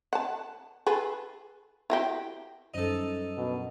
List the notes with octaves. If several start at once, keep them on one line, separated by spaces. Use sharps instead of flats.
F#5 A5
G#4 A4 B4
E4 F#4 G4
F#2 G3 C#4 D#4 A4 C5
B2 D4 A#4